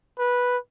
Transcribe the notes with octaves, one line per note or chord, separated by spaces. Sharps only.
B4